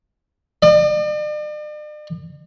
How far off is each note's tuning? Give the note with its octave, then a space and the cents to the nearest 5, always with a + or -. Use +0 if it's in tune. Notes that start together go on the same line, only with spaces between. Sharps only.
D5 +45